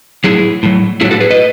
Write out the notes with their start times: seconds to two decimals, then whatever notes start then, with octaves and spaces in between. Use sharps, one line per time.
0.24 A2 F#3 E4 G#4
0.63 A2 F#3
1.01 A2 F#3 E4 G#4
1.11 F#4 A4
1.20 G#4 B4
1.31 B4 D#5